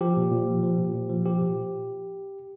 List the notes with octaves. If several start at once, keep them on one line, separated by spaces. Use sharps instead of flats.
F3 G4
A#2
A#2
F3
F3
A#2
A#2
F3
F3 G4
A#2